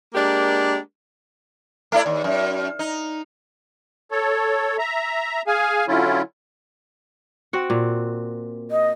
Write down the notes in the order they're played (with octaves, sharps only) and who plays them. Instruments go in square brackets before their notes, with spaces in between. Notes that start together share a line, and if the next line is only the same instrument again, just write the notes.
[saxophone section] G#3 A#3 D4 G4 A#4
[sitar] A3 E4 D5
D#2
F#2
D#4
[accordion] A4 C#5
E5 A#5
G#4 F5 G#5
D3 F#3 C#4 E4 F4
[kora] C4 F#4 F#5
A#2
[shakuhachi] D#5